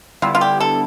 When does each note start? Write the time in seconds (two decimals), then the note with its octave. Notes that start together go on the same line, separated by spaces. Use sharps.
0.22 D3 G3 B3 E4 F4
0.35 F4
0.41 G4
0.60 A4